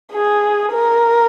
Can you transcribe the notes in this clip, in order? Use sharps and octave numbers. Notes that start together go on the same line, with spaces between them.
G#4
A#4